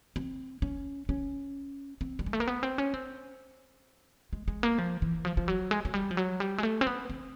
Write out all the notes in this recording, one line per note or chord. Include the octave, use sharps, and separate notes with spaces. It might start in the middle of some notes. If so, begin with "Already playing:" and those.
C4
C#4
C#4
C4
G3
G#3
A3
A#3
B3
C4
C#4
C4
G#3
G#3
A#3
F3
E3
F3
F3
F#3
G#3
F#3
G3
F3
F#3
G3
G#3
A3
C4
B3
C4